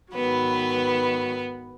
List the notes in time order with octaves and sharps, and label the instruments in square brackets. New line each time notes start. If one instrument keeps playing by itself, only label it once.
[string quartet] G#2 D#3 F#3 B3 B4